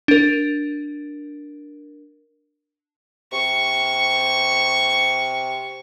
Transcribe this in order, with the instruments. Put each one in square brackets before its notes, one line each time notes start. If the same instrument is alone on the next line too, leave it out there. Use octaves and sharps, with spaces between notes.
[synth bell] D4 A#4
[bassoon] C3 [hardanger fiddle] C#6